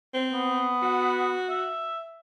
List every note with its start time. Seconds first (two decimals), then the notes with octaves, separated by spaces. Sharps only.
0.14 C4
0.32 B3
0.82 F#4
1.49 E5